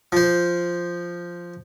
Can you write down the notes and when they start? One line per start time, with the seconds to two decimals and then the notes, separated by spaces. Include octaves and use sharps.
0.12 F3 C5